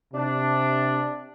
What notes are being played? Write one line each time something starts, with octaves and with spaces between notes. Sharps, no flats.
C3 D4